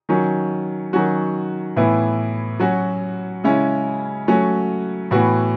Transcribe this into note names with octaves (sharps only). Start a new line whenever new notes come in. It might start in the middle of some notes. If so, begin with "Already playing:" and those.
D#3 F#3 C#4
D#3 F#3 C#4 F#4
A2 E3 B3 E4
F#3 C#4 F#4
C#3 G#3 C#4 E4
F#3 A3 C#4 F#4
A2 E3 B3 F#4